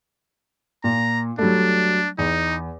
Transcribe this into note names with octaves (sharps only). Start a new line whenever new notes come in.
A#2 A#5
F#3 G3 A3 D4
E2 D#4